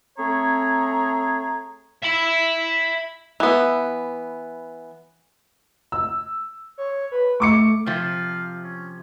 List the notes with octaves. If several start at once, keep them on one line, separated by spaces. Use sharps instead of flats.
A3 C4 G#4 C#5 A#5
E5 B5
E3 B3
E6
C#5
B4
A3 C#6 D6 C#7
C3 F3 F5
C#4